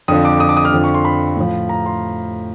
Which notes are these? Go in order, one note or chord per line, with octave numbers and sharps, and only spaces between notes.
F2 D3 F3 D#6
D6
D#6
D6
D#6
F6
F2 D3 F3
C#6
C6
B5
A2 F3
A#5
C6